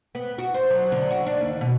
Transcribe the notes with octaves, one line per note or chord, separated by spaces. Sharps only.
B3
F#4
C5
F#3
D3
F#4
D4
D#2
B2